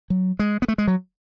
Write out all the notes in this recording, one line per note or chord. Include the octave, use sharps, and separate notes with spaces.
F#3
G#3
B3
A3
G#3
F#3